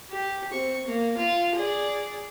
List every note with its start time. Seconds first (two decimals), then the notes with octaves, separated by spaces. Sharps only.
0.11 G4
0.52 C4 C#6
0.86 A#3
1.17 F4
1.55 G#4 D5